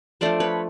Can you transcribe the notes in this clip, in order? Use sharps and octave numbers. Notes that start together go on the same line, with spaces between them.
F3 A3 D4 C5 D5
B4 C#5